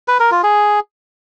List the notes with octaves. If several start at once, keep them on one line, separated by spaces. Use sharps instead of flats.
B4
A#4
F4
G#4